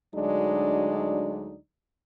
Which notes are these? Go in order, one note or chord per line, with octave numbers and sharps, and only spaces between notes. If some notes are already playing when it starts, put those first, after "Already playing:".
D2 F#3 G#3 D4 D#4 D5